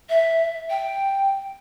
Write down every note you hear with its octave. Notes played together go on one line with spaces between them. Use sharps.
E5
G5